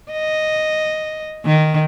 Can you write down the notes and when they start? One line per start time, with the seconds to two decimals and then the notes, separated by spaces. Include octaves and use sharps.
0.12 D#5
1.45 D#3